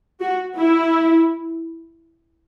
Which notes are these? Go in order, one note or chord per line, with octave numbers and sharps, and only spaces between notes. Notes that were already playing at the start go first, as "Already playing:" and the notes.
F#4
E4